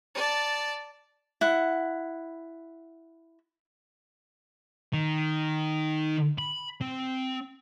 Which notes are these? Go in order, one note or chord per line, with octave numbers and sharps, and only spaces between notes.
D5 A5
E4 F#5
D#3
B5
C4